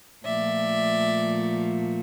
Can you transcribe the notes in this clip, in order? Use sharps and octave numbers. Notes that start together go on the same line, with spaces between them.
A#2 F3 A3 D5 E5